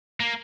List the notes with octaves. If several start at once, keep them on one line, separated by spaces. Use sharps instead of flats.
A#3